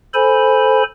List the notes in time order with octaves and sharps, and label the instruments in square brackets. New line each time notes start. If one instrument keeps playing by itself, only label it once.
[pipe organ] A4 C5 G#5 B5